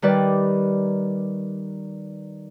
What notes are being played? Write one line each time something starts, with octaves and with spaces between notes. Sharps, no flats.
D#3 G3 B4 D5